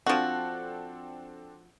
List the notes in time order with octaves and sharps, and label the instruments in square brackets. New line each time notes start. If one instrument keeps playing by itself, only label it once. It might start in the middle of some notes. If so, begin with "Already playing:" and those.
[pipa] F3 F#4 [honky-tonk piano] C4 D4 A4